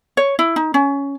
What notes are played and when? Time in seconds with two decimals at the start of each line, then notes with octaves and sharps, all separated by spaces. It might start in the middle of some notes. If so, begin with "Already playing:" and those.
0.17 C#5
0.39 E4
0.56 D#4
0.74 C#4